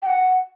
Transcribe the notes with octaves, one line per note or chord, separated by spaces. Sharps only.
G5
F#5